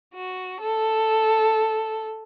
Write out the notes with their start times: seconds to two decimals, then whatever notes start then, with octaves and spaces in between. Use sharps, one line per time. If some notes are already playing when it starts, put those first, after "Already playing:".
0.15 F#4
0.61 A4